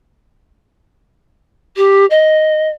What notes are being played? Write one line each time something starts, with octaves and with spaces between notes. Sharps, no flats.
G4
D#5